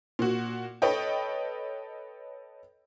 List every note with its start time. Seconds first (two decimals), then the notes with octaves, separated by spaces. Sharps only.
0.19 A#2 F#4
0.82 A4 B4 C#5 D#5 G5